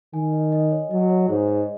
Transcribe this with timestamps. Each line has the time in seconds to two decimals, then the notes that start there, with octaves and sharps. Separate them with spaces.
0.13 D#3 G#5
0.33 D#5
0.52 D#5
0.71 C#5
0.91 F#3 D#5
1.10 C#5
1.29 G#2 C#5
1.48 D#5